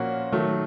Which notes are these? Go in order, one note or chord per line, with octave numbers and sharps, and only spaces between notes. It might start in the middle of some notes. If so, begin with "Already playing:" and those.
Already playing: A#2 F3 A#3 C#4 F#4
D#3 F#3 A3